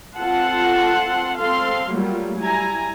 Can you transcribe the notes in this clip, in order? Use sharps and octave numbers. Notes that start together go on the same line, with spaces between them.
C4 F4 A4 F#5 A5 C6
C4 A4 F5 C6
F#3 G3 A3 A#3 F4
G3 E4 G#5 A#5